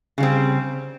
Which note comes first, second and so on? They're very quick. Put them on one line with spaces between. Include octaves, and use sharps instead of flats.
C#3 G3 C4